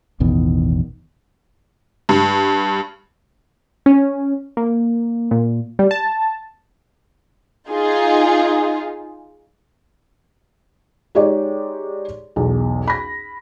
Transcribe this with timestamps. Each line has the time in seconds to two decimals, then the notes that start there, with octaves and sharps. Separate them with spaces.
0.20 A1 E2 B2 D#3
2.09 G2
3.86 C#4
4.57 A#3
5.31 A#2
5.79 G3
5.91 A5
7.69 D#4 F4 G#4
11.15 G#3 D#4 G4 G#4 C#5 D5
12.36 B1 E2
12.88 B5 A#6